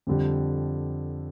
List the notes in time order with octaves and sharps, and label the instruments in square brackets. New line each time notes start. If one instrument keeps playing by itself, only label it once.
[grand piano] F2 D3 G3